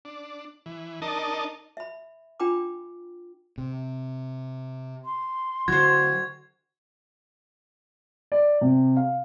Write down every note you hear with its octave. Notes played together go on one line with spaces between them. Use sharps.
D4
E3
D4 D#4 A#4 D#5 A5
E5 B5
D4 F4 G5 A#5 B5 D6
C3
C6
D3 F#3 F#4 C5 G#6
D5
C3
F5